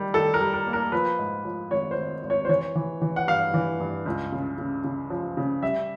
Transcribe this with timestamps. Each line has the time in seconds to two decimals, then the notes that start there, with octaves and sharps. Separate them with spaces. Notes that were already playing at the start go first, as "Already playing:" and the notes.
Already playing: D#3 G3
0.14 D#3 A4
0.34 A#4
0.41 G3
0.54 A#4
0.67 A#3
0.73 A#4
0.92 F3 B4
1.19 G#2
1.45 F3
1.71 G#1 C#5
1.91 C5
1.97 G#1
2.23 G#1
2.30 C#5
2.45 C5
2.49 E3 C#5
2.76 E3
3.02 E3
3.16 F#5
3.28 G2 F5
3.54 E3
3.80 G2
4.06 C#2
4.32 C#3
4.58 C#3
4.84 C#3
5.10 F3
5.37 C#3
5.63 G3 E5